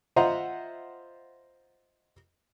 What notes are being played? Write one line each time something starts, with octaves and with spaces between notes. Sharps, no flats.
F4 C5 D#5 E5 F#5 A#5